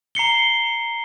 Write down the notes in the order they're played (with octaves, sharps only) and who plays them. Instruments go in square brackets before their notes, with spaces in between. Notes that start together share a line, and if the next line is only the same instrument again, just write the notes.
[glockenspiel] A#5 C7 C#7 G7